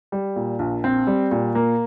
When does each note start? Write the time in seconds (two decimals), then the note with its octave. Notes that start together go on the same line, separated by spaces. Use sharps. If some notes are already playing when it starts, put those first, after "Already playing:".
0.12 G3
0.36 A#2
0.59 A#1
0.84 C4
1.07 G3
1.32 A#2
1.55 A#3